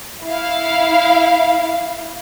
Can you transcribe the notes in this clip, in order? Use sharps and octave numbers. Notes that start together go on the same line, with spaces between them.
E4 F5